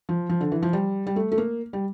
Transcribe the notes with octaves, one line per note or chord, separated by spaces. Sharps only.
F3
F3
D3
E3
F3
G3
G3
A3
A3
A#3
G3